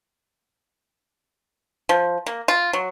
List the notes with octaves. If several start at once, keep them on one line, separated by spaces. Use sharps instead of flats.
F3
A#3
F4
F#3